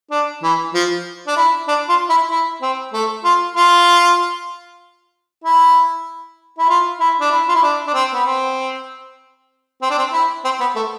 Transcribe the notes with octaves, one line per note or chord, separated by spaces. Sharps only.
D4
E3
F3
D4
E4
D4
F4
E4
E4
C4
A3
F4
F4
E4
E4
F4
E4
D4
E4
F4
E4
D4
D4
C4
B3
C4
C4
D4
C4
E4
C4
B3
A3